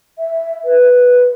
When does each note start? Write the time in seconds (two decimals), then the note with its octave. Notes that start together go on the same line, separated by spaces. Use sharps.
0.19 E5
0.65 B4